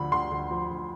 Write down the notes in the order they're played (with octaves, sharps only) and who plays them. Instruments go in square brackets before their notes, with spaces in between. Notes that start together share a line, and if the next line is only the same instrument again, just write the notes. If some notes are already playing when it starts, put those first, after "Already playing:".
Already playing: [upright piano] D2 D3 F3 B5
D2 C6
D2
F3
D2